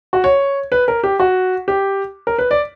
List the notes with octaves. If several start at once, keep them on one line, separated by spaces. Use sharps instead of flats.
F#4
C#5
B4
A#4
G4
F#4
G4
A#4
B4
D5